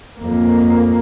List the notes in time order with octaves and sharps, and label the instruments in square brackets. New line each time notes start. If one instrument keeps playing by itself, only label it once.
[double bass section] F2 A#3